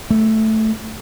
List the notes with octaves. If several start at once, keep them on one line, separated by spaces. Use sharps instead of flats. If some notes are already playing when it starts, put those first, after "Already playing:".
A3